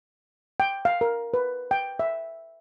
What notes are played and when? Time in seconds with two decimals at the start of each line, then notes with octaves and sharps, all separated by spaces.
0.60 G5
0.85 F5
1.01 A#4
1.34 B4
1.71 G5
1.99 E5